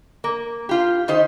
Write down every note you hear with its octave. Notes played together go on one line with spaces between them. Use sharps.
A#3
F4 G4
D#3 D#4 G4 C5